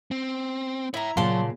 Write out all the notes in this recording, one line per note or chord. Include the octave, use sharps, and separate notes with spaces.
C4
E4 C#5 E5 A#5
A#2 C#3 F#3 D5 F5 A5 C6